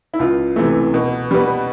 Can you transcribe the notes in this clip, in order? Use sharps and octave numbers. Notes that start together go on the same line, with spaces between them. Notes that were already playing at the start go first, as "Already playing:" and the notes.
E4
C#2 F4
C3 E3 A3
B2
G3 B3